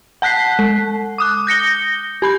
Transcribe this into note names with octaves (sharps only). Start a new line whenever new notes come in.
F#5 A5 F#6 B6 C7
G#3
D6 D#6 F#6
G6 A#6 C#7 G7
G4 B5 G6